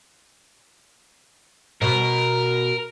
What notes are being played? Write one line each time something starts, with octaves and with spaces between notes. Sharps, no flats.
B2 A#4